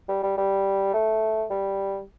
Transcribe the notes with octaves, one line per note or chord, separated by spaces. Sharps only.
G3
G3
G3
A3
G3